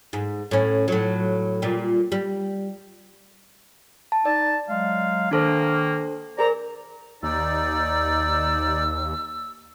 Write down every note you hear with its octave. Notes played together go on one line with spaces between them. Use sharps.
G#2
A2 C#4
A2 F#3
A#2 G3
G3
A5
D#4 D5 A5
F#3 G#3 F5
D#3 A#3 D4 A4 C5
G#4 A#4 C5 D5 A#5
D#2 D#4 D5 E6